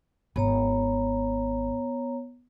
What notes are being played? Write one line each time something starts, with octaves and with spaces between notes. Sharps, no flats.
G#1 B3 C#5 A#5